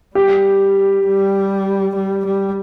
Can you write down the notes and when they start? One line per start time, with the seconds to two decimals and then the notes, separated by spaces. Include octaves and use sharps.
0.15 G3 G4
1.06 G3
1.95 G3
2.25 G3